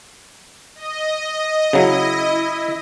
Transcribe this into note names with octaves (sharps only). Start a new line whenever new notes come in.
D#5
C#3 F#3 E4